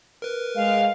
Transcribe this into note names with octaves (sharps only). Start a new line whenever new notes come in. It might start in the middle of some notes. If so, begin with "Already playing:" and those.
A#4 B4
G#3 F5